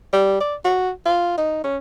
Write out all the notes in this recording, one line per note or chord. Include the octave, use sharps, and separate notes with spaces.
G3
D5
F#4
F4
D#4
C#4